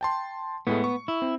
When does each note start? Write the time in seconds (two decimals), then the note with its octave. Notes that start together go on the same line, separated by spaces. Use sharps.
0.01 G5 A5 C6
0.67 A2 G#3 A3 B3
0.84 C#6
1.08 E4
1.22 C4